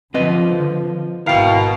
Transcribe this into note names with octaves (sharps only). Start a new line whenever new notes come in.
D3 F3 C4 B4 D#5
G#1 B2 E4 A#4 F5 G5